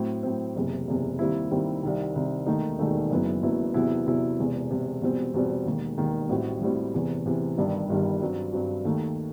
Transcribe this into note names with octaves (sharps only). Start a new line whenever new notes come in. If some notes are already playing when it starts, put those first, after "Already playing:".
Already playing: A2 F#3 C4
A2 F#3 C4
F#1 E2 C3
F#1 E2 C3
D#2 D#3 G3 C4 E4
D#2 D#3 G3 C4 E4
C2 C3 D#3
C2 C3 D#3
E1 D#2 D#3 A3 D#4
E1 D#2 D#3 A3 D#4
F#1 F#2 F#3 B3 E4
F#1 F#2 F#3 B3 E4
E2 C3 F#3 B3 E4
E2 C3 F#3 B3 E4
E1 E2 C3
E1 E2 C3
E2 B2 G3 C4
E2 B2 G3 C4
E1 D#2 D#3
E1 D#2 D#3
A1 A2 G3 C4 F#4
A1 A2 G3 C4 F#4
E2 C3 E3
E2 C3 E3
G1 G2 D#3 G3
G1 G2 D#3 G3
G2 F#3 C4
G2 F#3 C4
D#2 D#3 A3